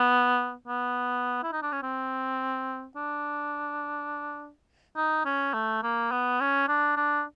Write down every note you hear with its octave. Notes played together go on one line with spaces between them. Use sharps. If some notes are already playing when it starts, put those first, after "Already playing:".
Already playing: B3
B3
E4
D#4
D4
C#4
C4
D4
D#4
C#4
A3
A#3
B3
C#4
D4
D4